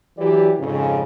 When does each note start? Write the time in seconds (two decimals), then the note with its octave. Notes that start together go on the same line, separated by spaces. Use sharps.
0.18 E3 F#3 E4 G4 D5
0.59 F2 G#2 C#3